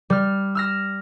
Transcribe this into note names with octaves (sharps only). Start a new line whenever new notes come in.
G3 F6
E6 F6 A#6